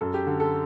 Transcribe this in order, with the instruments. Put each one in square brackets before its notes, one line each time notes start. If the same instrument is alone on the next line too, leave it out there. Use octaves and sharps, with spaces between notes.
[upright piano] F#2 A4
G4
D3
A4